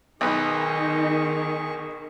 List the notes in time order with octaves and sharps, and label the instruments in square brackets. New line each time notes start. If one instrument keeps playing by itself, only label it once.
[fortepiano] B1 B4 [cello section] D#3 [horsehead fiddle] D#4 D#5 [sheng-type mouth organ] G#4 C#6